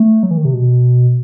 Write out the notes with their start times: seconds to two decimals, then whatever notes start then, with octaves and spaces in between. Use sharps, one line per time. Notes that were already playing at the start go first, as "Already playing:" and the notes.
Already playing: A3
0.23 F#3
0.31 E3
0.37 D#3
0.45 C3
0.53 B2